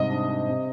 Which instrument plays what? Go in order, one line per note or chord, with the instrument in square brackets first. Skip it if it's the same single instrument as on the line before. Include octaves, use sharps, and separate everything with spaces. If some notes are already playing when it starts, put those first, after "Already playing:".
Already playing: [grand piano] G#2 C3 G3 [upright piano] D#5
[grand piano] D4
D4
C3